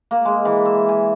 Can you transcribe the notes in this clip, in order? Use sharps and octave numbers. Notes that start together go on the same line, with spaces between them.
A#3
G#3
E3
E5
G#5